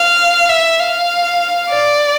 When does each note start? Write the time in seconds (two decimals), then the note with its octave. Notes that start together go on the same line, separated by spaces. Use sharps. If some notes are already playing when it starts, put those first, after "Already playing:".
Already playing: F5
0.49 E5
0.80 F5
1.70 D5